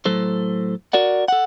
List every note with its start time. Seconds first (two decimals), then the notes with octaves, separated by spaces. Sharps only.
0.05 A2 F#3 A4 C5
0.93 F#4 A#4 D5 F#5
1.28 A4 F#5